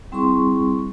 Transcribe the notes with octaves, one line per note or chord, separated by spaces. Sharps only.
G3 C4 E4 G#4 C6 C#6